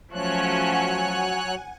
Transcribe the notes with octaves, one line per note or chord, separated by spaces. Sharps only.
F3 F#3 A3 C#4 C#5 F#5 G#5 F#6